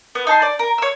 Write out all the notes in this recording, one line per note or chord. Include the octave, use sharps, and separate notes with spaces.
B3
D#4 A5 C6
D5
A#4
C#5 E6